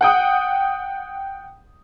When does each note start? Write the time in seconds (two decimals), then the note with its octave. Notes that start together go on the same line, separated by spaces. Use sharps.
0.01 F#5 G5 D#6